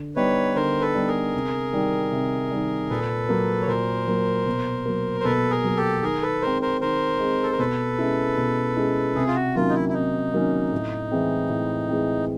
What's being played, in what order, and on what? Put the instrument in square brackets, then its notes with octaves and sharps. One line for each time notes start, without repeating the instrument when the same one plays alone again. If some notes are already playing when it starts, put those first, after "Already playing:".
Already playing: [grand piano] D3
[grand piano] G3 B3 D#4 [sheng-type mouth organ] B4 C#5
[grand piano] D3 [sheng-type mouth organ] A#4 C5
[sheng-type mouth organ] A4 B4
[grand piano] G3 B3 D#4
[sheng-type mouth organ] G#4 A#4
[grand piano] C3
D#3 G3
C3
D#3 G3
[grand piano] A#2 [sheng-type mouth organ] A4 B4
[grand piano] F#3 A#3
[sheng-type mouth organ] C#5
[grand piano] A#2 [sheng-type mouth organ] A#4 C5
[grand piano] F#3 A#3
B2
F#3 A#3
[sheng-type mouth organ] C5
[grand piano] B2 [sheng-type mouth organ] A4 B4
[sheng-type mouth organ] G#4 A#4
[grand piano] F#3 A#3
[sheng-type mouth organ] G4 A4
[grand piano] D#3 [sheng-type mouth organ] G#4 A#4
[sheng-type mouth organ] A4 B4
[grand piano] G#3 C4 [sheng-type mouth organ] A#4 C5
[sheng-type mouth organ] A#4 C5
[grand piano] D#3 [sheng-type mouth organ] A#4 C5
[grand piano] G#3 C4
[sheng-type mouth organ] A4
A#4
[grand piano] B2 [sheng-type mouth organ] A4 B4
[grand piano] G#3 C#4 E4
B2
G#3 C#4 E4
[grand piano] C3 [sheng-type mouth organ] G#4
[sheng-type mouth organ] F4
F#4
[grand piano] D#3 F#3 A#3 C#4 [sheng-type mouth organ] F4
[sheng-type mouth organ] D#4
E4
E4
[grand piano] C3 [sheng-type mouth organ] D#4
[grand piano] D#3 F#3 A#3 C#4
A2
E3 G#3 C4
A2
E3 G#3 C4